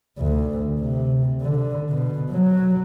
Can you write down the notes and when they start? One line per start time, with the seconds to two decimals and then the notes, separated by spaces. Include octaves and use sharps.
0.19 D2
0.80 C3
1.42 D3
1.89 B2
2.30 F#3